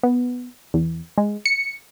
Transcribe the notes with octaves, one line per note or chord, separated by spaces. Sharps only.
B3
E2
G#3
C#7